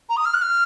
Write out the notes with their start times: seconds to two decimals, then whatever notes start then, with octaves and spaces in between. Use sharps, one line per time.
0.09 A#5
0.17 D#6
0.25 F6
0.34 F#6
0.42 F6